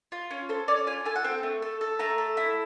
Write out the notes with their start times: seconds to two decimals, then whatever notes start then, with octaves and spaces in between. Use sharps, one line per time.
0.12 F4
0.31 C#4
0.49 A4 C5
0.68 C#4 D5
0.87 F4 G#5
1.05 A4 G#5
1.16 F#5
1.24 C4 G5
1.43 A3
1.62 A4
1.81 A4
1.99 A3 A#5
2.18 A4
2.37 E4